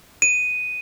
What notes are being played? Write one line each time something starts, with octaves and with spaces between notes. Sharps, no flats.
D#7